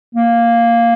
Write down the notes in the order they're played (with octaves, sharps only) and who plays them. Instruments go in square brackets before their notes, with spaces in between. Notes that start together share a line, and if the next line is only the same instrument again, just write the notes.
[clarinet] A#3